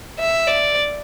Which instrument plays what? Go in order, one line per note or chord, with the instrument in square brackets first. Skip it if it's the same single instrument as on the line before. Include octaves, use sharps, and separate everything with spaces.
[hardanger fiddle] E5
D5